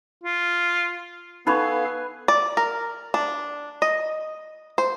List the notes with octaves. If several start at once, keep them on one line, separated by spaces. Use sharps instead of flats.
F4
B3 D#4 A4 B4 F5 G#5 B5 C#6
D5
A#4
D4
D#5
C5